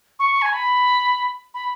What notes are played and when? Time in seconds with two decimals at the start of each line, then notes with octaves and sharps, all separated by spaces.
0.19 C#6
0.32 C#6
0.42 G#5
0.53 B5
1.54 B5